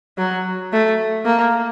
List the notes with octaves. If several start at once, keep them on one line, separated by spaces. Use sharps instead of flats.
F#3
A3
A#3